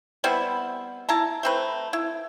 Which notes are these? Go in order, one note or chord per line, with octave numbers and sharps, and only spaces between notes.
G3 B3 C4 E4
E4 A5 A#5
A3 C4 B4
E4